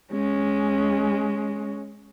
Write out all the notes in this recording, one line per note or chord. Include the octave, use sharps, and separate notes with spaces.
G#3 C#4